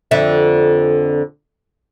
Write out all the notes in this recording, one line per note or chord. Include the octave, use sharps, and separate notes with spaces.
F2 D3 E5